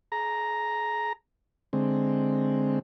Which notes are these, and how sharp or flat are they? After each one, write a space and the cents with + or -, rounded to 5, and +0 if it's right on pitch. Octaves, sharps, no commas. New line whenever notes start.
G#4 +35 A#5 +0
D3 +0 G#3 +0 C4 +0